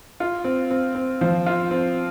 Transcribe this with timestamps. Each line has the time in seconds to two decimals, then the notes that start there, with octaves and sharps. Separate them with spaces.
0.20 F4
0.44 C4
0.71 C4
0.95 C4
1.21 F3
1.46 F4
1.71 C4